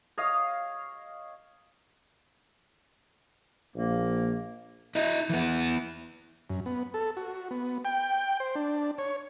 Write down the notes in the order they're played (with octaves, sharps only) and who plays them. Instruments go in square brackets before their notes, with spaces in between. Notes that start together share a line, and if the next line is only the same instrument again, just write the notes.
[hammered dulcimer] C#5 D#5 F5
[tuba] A#1 [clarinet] A#3
[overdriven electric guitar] E4 D#5
E3 B3
[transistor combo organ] F#2
B3
A4
F#4
B3
G5
C5
D4
C#5